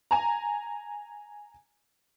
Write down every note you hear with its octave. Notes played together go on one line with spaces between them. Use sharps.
G#5 A#5